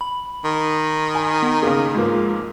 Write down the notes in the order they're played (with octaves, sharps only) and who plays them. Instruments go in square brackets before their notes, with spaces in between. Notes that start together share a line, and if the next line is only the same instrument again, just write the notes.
[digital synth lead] B5
[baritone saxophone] D#3
[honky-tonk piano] G#5
[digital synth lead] B3
[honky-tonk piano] C#3 A#3 [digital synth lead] G#4
[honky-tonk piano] G#2 F3 A#3